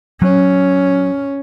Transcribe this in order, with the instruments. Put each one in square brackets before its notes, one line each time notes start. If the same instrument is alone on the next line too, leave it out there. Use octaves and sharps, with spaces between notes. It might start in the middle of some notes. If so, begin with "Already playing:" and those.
[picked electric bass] F#3 [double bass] C#4